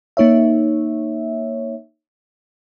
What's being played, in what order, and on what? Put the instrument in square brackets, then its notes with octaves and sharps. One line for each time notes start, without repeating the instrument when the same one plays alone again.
[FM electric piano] A#3 D#4 C#5 E5